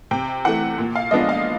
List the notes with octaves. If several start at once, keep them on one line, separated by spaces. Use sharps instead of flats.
C3 G5
E3 A3 F#5
A#2
F5
F3 G#3 B3 D4 D#5
F5